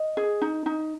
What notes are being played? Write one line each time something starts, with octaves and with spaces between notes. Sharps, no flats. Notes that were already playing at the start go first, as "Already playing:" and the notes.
Already playing: D#5
G#4
D#4
D#4